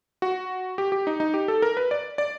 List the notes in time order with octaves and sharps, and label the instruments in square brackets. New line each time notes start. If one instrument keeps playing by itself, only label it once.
[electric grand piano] F#4
G4
G4
D#4
D#4
G4
A4
A#4
B4
D5
D5